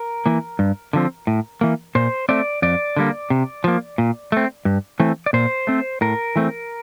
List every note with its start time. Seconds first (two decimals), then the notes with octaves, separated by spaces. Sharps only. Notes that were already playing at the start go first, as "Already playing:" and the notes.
Already playing: A#4
0.26 E3 A#3
0.59 G2
0.93 D3 F3 C4
1.27 A2
1.61 E3 A#3
1.95 A#2 C5
2.29 A3 C4 D5
2.62 F2 D5
2.96 D3 G3 A#3
3.30 C3
3.64 F3 A#3
3.98 A#2
4.32 A3 C4
4.65 G2
5.00 E3 A3 C4
5.26 D5
5.33 A#2 C5
5.67 A3 C4
6.01 A2 A#4
6.36 E3 A3 C4